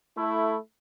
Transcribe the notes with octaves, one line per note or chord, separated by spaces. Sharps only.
A3 E4